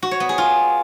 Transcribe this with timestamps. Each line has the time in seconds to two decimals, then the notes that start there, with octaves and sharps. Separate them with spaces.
0.03 F#4
0.11 C#5
0.20 B3
0.29 G#4
0.38 F4